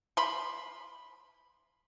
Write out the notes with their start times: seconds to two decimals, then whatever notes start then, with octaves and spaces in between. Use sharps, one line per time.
0.17 B5 C6